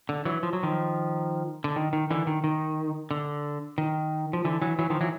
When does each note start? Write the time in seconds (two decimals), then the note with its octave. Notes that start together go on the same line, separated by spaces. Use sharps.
0.09 D3
0.25 E3 F#3
0.43 F3
0.53 F#3
0.63 D#3 F3
1.64 D3
1.76 D#3
1.93 D#3
2.10 D3 E3
2.27 D#3
2.44 D#3
3.11 D3
3.78 D#3
4.33 F3
4.45 D3 E3
4.62 E3 F#3
4.79 E3 F#3
4.90 D#3 F3
5.01 E3 F#3